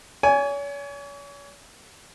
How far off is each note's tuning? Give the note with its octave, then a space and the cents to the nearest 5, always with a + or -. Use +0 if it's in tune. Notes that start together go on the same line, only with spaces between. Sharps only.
C#5 +40 G#5 +0